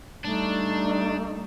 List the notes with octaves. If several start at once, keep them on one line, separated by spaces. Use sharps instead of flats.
G3 A3 D4 D#4